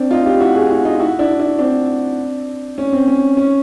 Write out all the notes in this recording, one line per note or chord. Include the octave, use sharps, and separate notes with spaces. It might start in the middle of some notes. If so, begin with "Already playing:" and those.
Already playing: C4 D4
D#4 F4
F4 G4
E4 F#4
F#4 G#4
E4 F#4
D#4 F4
E4 F#4
D4 E4
D4 E4
C4 D4
C#4
C4
C#4
C#4